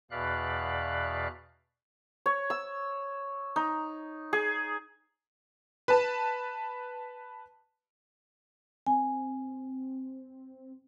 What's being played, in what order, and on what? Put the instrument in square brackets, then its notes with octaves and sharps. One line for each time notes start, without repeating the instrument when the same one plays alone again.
[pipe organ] E2 B2 D5 F5 B5 F#6
[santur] C#5
E6
D#4
G#4
[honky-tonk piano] B4 A5
[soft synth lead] C4 [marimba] G#5